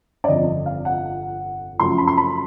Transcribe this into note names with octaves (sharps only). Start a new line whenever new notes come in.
D5
G1 F2 C3 D#5
F5
F#5
F#2 C#3 F3 A3 C6
B5
C6
B5